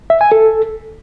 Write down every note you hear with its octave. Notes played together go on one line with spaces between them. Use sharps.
E5
G#5
A4